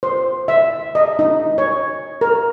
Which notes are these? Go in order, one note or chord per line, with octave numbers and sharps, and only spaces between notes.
C5
E5
D#5
D#4
C#5
A#4